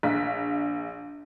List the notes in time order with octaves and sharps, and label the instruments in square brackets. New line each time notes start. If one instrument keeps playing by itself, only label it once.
[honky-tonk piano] A#1 F5 B6